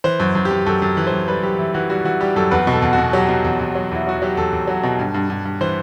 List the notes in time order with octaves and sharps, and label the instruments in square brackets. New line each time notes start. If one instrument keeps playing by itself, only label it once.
[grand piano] E3 C5
F#2
F#2
G4
F#2
F#2 A4
F#2
E3
C5
F#2
G3 B4
F#2 G4
E3 E4
E3 F#4
G3 F#4
E3 F#4
G3 G4
F#2 A4
E2 B4
B2 A4
E2
F#4
B2
F#3 G4
B2
E2
E2
F#3
E2 E4
F#3 F#4
F#3 G4
E2 A4
E2
F#3
B2
G2
G2
G2
G2
E3 C5